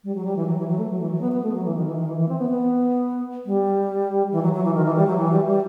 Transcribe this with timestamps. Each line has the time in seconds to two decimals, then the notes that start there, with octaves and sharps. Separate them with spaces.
0.04 G3
0.15 F#3
0.25 G3
0.36 E3
0.47 F#3
0.57 E3
0.68 F#3
0.78 A3
0.89 F#3
1.00 E3
1.11 F#3
1.21 B3
1.32 B3
1.44 A3
1.54 F#3
1.65 E3
1.75 D#3
1.86 E3
1.96 D#3
2.07 E3
2.18 E3
2.29 C4
2.39 B3
2.49 B3
3.46 G3
4.32 E3
4.43 F#3
4.53 F#3
4.64 E3
4.74 D#3
4.85 E3
4.96 G3
5.07 F#3
5.17 E3
5.32 G3
5.46 G3